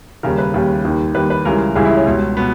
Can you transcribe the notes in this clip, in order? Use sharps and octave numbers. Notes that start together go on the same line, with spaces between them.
D#2 C#3 G3 A#4
B4
D#2 C#3 G3
D#2 D#3 G3
D#2 D#3 G3 B4
B4
C#2 C#3 E3 G3 A#4
C#2 C#3 E3 G3 G#4
E4
C#4
C#2 B2 G3
B2 B3